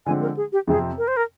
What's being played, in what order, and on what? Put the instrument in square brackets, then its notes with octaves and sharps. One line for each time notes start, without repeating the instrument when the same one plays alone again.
[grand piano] D3 F3 G#3 C4 [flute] G#5
[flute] A#4
G#4
G4
[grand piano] F2 C3 F3 C4 [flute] G#4
[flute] A#4
C5
A#4